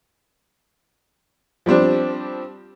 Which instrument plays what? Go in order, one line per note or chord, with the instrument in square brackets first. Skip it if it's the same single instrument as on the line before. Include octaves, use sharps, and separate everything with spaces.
[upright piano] F3 G3 C4 D4